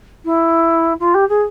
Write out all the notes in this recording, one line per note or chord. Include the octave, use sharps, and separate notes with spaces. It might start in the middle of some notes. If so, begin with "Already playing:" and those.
E4
F4
G4
G#4